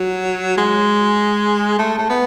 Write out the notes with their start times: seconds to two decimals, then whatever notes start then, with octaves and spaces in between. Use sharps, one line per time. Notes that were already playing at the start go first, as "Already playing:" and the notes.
Already playing: F#3
0.58 G#3
1.79 A3
1.98 A3
2.09 B3